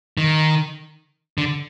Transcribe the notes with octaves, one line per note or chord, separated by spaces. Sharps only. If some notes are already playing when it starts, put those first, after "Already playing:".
D#3
D3